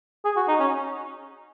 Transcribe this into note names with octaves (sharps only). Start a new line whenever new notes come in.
G#4
F#4
D#4
C#4